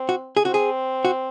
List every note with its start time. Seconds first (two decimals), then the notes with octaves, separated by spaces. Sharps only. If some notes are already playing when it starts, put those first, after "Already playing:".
Already playing: C4
0.09 F#4
0.37 G#4
0.45 C4 F#4
0.54 G#4
1.05 F#4